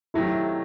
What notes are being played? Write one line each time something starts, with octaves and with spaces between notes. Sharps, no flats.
C3 D#3 F#3 A3 E4